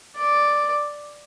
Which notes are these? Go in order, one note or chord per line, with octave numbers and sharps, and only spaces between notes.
D5